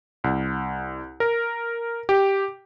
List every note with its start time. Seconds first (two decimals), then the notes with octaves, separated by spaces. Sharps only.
0.24 C2
1.20 A#4
2.09 G4